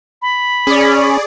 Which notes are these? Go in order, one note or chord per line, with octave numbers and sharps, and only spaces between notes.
B5
C#4 G#4 D5